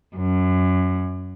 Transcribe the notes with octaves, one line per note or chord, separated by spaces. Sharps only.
F#2